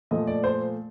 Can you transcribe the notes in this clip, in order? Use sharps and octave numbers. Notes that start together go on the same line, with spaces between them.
A#2 F3 A3 D#5
D5
C5